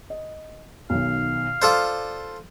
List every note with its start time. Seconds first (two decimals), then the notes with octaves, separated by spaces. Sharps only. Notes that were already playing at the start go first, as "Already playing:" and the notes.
0.10 D#5
0.90 B1 D#3 F5
1.62 F4 A4 C5 D5 D6